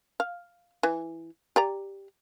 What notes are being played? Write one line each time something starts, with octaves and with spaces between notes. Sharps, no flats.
F5
E3
G4 D5 A#5